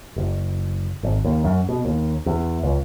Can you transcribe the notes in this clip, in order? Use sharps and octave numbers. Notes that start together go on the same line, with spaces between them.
F#1
G#1
D#2
F#2
B2
D#2
E2
C#2